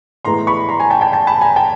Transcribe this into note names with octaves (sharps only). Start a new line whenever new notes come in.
A2 E3 G#3 B3 A#5 C6
B5 C#6
A#5 C6
G#5 A#5
G5 A5
G5 A5
G5 A5
A5 B5
G#5 A#5
G5 A5